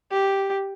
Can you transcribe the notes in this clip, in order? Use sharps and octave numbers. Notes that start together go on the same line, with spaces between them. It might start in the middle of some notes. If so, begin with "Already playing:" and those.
G4